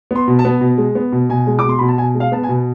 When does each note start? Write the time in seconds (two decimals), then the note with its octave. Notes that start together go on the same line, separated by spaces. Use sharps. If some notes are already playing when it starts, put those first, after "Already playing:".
0.11 B3 C6
0.28 B2
0.39 A5
0.45 B3
0.61 B2
0.78 G#3
0.95 B3
1.12 B2
1.29 B2 G#5
1.47 G#3
1.59 D6
1.64 B2 C6
1.79 B2 B5
1.88 A5
1.98 B2 G#5
2.15 G#3
2.20 F5
2.32 B3 A5
2.43 G#5
2.49 B2